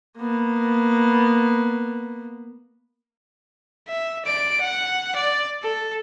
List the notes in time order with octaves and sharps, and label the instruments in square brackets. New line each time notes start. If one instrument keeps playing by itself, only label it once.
[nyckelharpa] A#3 B3
[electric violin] E5
D5 D7
F#5
D5
A4